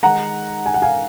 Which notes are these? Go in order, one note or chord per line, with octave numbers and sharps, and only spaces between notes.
D#3 G#3 D#4 F#5 A#5
G#5
F#5
F5 G#5